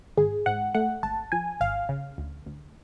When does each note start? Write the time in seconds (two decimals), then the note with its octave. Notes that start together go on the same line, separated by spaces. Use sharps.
0.17 G#1 G#4
0.46 G#2 F#5
0.75 A3 F#5
1.03 G#1 A5
1.32 F3 G#5
1.61 G#1 F5
1.89 C#3
2.18 D2
2.46 D2